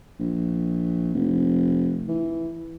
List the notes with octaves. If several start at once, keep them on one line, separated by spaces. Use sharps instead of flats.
A#1
F1
E3